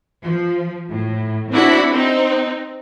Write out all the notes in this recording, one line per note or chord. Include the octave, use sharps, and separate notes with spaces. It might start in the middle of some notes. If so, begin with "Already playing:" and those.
F3
A2
C4 D4 E4 F#4 B5
C4 D#4